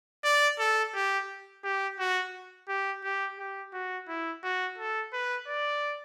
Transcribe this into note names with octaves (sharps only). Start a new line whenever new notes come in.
D5
A4
G4
G4
F#4
G4
G4
G4
F#4
E4
F#4
A4
B4
D5